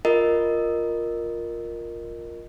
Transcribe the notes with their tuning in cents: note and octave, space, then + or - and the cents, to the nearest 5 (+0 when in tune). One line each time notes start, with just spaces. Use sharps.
F4 +5 A#4 +0 D#5 -10